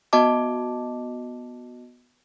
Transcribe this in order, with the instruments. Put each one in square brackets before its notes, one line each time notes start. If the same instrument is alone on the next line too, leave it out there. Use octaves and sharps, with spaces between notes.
[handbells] B3 F#4 D#5 A5 D6